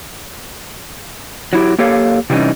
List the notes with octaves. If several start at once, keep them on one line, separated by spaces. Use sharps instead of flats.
F#3 E4 G4
A#3 G4 A4 C#5 F5
C3 E3 G3 C#4 D#4